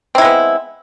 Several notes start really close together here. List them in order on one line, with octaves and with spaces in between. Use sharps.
C4 E4 G#3 B3